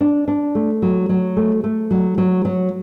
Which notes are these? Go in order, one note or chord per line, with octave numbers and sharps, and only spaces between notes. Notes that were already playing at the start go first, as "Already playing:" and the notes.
D4
D4
A3
F#3
F#3
A3
A3
F#3
F#3
F#3